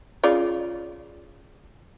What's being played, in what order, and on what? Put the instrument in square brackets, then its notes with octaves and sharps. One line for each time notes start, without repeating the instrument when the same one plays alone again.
[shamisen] C#3 F4 D5